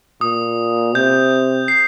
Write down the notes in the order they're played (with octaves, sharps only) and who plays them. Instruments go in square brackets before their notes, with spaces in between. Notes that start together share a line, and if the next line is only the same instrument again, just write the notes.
[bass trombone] A#2 [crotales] D#6
[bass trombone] C3 [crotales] G6
[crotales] C7